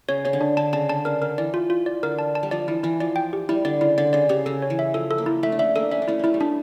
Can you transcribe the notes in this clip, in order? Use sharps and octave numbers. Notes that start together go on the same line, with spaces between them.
C#3 C#5
C#3 C#5
D3
D4
D3 A5
C#3 A5
D3 A5
C#3 A#4
D3 A#4
E3 D5
F4
F4
D5
D3 A#4
A5
A5
G3
F3 D5
E3 E4
E3 E4
F3 D5
G5
G4
G3 E4
D3 D5
C#3 E4
D3 D5
C#3 D5
C#3 G4
C#3 A4
C#5
E3
E5
F3 A4
A4
A#3
E4
A3 E5
D4
A3 C#4 E5
A#3 D4 A4
A3 C#4 E5
D4
A3 C#4 E4
A3 A#3 E4
G3
A3 D4